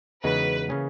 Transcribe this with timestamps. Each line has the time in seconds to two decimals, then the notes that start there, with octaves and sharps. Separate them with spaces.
0.24 E2 C#3 G#3 D#4 F#4 B4
0.69 C#3 E3 A#3 C#4 G#4